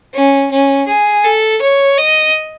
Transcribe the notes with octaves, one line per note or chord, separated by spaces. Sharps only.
C#4
C#4
G#4
A4
C#5
D#5